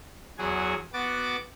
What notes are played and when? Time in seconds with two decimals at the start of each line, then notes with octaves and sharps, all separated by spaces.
0.38 E2 F#3 F#4 G#4 G#5
0.93 B3 F#4 D6 A6